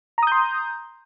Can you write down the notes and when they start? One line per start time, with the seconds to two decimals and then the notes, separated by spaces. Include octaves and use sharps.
0.18 A#5
0.23 D#6
0.27 G6
0.32 C6